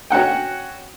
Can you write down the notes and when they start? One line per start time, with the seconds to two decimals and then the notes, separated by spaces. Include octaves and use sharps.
0.10 C#4 F#4 F#5 G5